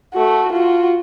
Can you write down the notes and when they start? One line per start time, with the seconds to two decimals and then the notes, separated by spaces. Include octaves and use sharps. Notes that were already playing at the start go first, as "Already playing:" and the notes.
0.14 A3 F#4
0.52 F4 F#4